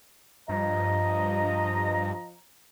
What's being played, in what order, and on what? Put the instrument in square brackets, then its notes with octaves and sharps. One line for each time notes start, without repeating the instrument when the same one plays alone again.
[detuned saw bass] G2 [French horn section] F3 D#5 [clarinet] A#5